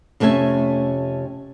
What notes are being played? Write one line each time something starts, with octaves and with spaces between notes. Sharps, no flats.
F2 C3 A3 C#4 E5 G#5